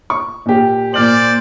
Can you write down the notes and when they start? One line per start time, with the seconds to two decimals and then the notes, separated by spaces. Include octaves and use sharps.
0.10 C#6
0.46 A#2 G4
0.94 A#2 C5 D5 F6 F#7